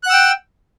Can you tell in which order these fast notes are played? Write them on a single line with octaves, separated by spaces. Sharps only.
F#6 F#5 E6 G5